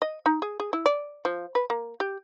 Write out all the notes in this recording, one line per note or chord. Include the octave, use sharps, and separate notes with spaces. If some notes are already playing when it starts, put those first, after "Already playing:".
D#5
D#4
G#4
G#4
E4
D5
F3
B4
A#3
G4